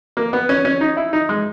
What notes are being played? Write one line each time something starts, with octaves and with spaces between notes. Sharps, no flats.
A#3
B3
C#4
C#4
D#4
E4
D#4
G#3